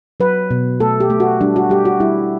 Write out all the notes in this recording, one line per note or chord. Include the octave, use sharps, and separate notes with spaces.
F#3 B4
B2
A3 A4
G4
A3
F#4
G3 D4
F#4
G3 G4
F#4
G3 E4